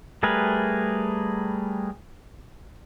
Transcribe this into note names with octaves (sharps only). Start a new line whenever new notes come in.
G3 A3 G#4 A#4 B4